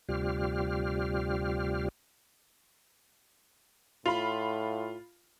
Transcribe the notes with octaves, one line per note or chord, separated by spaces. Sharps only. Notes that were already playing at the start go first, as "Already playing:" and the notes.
D2 C3 G3 F4 G4 F6
A2 F4 B5